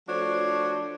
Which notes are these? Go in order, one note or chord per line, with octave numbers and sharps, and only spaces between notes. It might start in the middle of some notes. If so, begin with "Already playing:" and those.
F3 A3 D4 F#4 C5 C#5